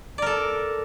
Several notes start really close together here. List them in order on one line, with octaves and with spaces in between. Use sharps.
D5 A#4 A4